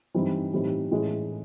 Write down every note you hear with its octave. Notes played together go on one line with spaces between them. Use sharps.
G2 E3 G3 C4 D#4
A2 E3 G3 C4 D#4
A2 E3 G#3 C#4